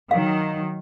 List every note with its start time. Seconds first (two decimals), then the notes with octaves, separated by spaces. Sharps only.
0.11 D#3 F#3 F5